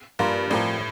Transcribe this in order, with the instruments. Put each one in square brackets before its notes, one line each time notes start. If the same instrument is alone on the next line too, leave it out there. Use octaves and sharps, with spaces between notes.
[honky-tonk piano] G2 [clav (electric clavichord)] A#3 F4 A#4 D5
[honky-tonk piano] A2 [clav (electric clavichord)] F3 C4 G4 A#4 D5